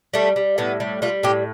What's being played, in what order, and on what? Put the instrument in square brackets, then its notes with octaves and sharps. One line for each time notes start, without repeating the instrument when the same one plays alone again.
[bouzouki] G3 A3
G3
A2 B3
G3
G3 F4
A2 G4